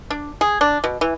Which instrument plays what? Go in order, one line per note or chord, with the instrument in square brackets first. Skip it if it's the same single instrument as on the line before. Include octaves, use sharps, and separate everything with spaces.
[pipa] D4
G#4
D4
B2
E3